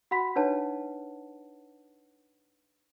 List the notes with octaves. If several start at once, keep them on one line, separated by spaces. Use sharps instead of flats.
F#4 F#5 B5 B6
D4 D#4 B4 C#5 F#5 A5